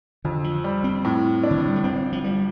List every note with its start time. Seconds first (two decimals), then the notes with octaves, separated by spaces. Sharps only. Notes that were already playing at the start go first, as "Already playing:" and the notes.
0.24 F2 D3
0.44 F3
0.64 G3
0.84 C4
1.05 A2
1.43 D4
1.51 D3
1.59 F3
1.67 G3
1.76 A3
1.83 G1 C4
2.12 F3
2.24 F3 G3